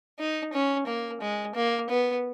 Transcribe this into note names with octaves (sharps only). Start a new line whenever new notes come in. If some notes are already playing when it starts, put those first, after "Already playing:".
D#4
C#4
A#3
G#3
A#3
B3